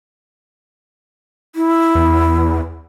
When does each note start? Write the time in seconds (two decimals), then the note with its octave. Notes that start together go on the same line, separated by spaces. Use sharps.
1.55 E4
1.95 E2